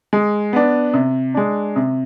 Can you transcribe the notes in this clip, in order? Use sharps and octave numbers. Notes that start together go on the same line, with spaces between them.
G#3
B3 D4
C3
G#3 D4
C3